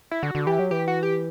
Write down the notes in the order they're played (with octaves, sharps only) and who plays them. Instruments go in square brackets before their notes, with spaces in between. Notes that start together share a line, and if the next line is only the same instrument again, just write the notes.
[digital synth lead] E4
[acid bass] D3 [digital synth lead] F#4
[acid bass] D3
[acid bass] E3 [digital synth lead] G4
[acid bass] F#3
[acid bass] E3 [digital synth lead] G4
[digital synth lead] F#4
G4